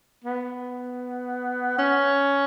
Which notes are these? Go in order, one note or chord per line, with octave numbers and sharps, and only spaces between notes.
B3
C#4